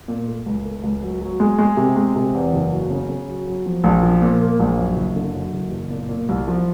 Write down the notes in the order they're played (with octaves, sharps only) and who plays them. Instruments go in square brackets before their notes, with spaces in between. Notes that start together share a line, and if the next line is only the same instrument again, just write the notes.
[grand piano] A#2
A3
C#2
A3
C#2
F#3
F#3
G#3
G#3
C3
G#3
C3
E2
F#1
F#3
C#3
C#3
F#3
F#3
F3
A#1
F3
A#2
A#3
A#1
F#2
F#1
D3
F#2
F#1
F#1
A#2
A#2
C2
F3